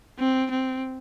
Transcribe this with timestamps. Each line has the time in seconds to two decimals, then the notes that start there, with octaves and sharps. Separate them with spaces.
0.19 C4
0.51 C4